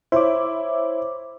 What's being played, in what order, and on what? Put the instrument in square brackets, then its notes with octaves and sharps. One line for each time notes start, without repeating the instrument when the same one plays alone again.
[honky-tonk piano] E4 [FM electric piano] C5 C#5 D6